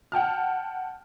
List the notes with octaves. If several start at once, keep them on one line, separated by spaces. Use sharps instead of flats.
F#5 G5 A5 F6